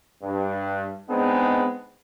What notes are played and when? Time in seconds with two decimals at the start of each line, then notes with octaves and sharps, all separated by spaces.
0.23 G2
1.10 G#3 B3 C4 D4 D#4 G#4